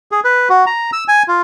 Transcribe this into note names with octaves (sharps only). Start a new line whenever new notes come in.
G#4
B4
F#4
A#5
E6
G#5
F4